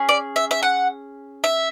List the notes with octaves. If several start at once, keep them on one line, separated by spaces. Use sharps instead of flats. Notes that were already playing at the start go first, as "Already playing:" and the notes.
Already playing: C#4 G#4
D5
E5
E5
F#5
E5